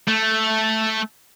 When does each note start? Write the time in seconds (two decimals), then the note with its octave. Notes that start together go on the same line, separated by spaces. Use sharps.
0.08 A3